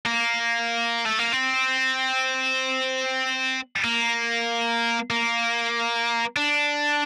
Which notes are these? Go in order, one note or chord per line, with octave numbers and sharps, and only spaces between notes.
A#3
A3
A#3
C4
A#3
A#3
D4